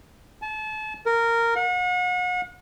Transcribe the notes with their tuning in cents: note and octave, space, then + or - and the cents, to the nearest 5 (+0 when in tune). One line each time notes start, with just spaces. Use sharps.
A5 -35
A#4 -10
F#5 -40